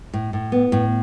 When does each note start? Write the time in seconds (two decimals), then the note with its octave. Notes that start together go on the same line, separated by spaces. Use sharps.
0.13 A2
0.33 A2
0.52 B3
0.72 A2